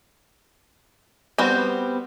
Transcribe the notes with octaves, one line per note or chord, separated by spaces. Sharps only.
G3 B3 C4 F#4